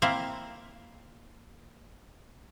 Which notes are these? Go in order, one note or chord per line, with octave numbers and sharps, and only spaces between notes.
A#3 C4 E4 E5 F5